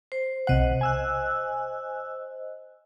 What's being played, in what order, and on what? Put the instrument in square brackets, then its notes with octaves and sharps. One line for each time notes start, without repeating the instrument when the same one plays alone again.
[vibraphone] C5
[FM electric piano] B1 C3 F#5 [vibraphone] C5 D#5
[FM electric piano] G#5 E6 F#6